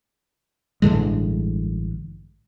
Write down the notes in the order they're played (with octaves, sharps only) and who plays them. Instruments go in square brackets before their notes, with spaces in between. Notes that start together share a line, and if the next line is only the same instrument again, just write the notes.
[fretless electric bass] A1 G2 D3 G#3